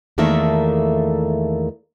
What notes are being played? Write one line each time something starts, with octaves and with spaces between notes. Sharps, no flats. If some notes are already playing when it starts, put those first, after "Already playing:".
E2 D#3 A3 A#3 A4 E5